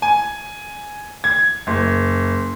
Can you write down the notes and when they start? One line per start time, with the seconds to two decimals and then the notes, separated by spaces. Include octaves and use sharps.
0.02 G#5
1.24 G#6
1.67 F#1